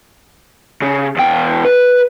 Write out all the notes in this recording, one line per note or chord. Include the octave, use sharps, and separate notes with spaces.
C#3
E2 G5
B4